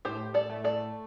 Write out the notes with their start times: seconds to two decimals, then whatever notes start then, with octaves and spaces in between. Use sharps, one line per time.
0.05 A2 G4 C5
0.34 A4 D5
0.50 A3
0.64 A4 D5